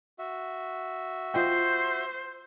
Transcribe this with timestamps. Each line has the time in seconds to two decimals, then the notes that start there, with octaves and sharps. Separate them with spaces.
0.19 F#4 E5
1.34 F4 C5 D#5 G5